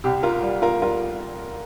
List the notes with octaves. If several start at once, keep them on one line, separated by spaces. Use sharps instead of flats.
C2 G4
F4 A#4
G3
F4 A#4
G3 F4 A#4